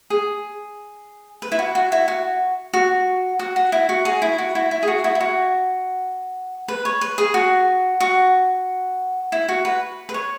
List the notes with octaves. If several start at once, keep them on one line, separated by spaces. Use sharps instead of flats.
G#4
B4
E4
F#4
F#4
E4
F#4
F#4
F#4
F#4
E4
F#4
G#4
E4
F#4
E4
E4
G#4
F#4
E4
E4
F#4
B4
C#5
B4
G#4
F#4
F#4
E4
F#4
B4
B4
C#5